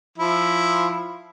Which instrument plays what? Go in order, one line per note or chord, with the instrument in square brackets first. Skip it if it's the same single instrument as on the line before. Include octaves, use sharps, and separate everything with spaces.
[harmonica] F3 E4